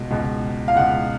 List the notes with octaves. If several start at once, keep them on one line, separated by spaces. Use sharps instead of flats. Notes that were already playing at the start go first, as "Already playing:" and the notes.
Already playing: C#2 B2
C#2 B2
F5
C#2 B2 F#5